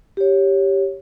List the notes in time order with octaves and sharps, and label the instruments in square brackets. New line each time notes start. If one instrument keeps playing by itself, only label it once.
[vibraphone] G4 C#5